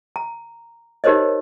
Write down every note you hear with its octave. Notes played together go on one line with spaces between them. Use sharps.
A#5
D#4 G4 A#4 C5 C#5 D#5